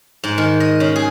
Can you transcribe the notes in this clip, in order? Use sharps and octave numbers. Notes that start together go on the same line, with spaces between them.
G#2
D#3
D#5
C#3
G#4